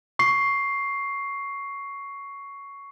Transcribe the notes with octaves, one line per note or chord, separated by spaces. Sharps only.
C#6 C7